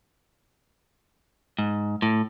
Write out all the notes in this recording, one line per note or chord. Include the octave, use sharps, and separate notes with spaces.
G#2
A2